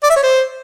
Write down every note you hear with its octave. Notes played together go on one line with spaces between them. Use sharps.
D5
E5
C#5
C5